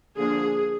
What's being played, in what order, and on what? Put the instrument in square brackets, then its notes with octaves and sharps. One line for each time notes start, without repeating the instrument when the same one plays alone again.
[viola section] D3 F3 A#3 D4 G#4